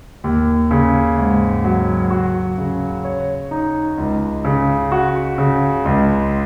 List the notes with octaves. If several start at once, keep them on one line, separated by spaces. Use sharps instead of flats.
D#2
C#3
G#2
F#3
F#4
C#3
C#5
D#4
C#2
C#3
F#4
C#3
C#2